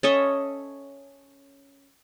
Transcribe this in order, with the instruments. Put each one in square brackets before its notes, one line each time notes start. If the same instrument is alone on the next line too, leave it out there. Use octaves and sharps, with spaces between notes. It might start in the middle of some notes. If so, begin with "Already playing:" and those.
[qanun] C#4 A4 D#5 E5